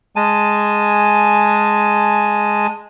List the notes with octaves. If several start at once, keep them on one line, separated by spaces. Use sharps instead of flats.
G#3 G#5 A5